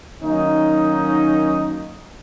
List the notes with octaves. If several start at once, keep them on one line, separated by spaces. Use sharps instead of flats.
D#3 F#3 A#3 C#4 D#4